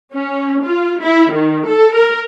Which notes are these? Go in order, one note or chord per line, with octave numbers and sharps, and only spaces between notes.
C#4
F4
E4
D#3
A4
A#4